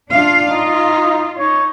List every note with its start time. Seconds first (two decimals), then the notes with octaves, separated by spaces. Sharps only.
0.10 D4 F4 F5
0.49 D#4 F4
1.38 D#4 C#5